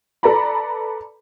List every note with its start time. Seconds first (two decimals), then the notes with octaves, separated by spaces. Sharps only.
0.23 A4 B4 D5 A#5 B5